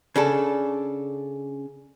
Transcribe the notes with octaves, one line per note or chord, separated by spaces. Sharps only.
C#3 D4 A4